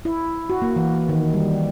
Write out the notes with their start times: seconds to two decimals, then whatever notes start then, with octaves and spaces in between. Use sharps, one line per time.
0.05 E4
0.50 F#4
0.62 A#3
0.76 E3
1.09 D#3
1.34 G3